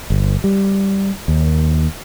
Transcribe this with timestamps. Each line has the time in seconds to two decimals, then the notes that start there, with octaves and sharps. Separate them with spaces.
0.10 G1
0.44 G3
1.28 D#2